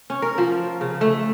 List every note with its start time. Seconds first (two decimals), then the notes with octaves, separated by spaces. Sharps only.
0.10 C#4
0.22 A#4
0.38 F3
0.81 C#3
1.01 A3